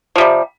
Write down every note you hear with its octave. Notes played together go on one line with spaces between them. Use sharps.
C3 F3 G3